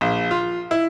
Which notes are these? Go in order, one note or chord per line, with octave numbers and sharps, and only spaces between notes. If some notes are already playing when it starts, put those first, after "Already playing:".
A#1
F4
E4